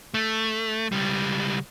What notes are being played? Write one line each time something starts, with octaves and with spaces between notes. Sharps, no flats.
A3
C#2 G3